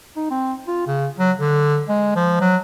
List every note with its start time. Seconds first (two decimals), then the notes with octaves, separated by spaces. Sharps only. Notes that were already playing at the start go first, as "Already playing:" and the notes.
0.16 D#4
0.31 C4
0.67 F4
0.87 C#3
1.19 F#3
1.40 D3
1.89 G#3
2.16 F3
2.41 F#3